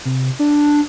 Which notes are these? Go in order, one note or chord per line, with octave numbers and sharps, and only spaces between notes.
C3
D4